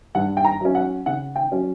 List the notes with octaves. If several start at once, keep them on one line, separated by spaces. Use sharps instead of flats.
G2 F#5
G5
A#5
F#3 C#4
F#5
C#3 F#5
G5
F#3 C#4